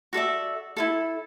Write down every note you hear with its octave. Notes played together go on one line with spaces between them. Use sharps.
F#4 A4 D5 E5
E4 F4 A4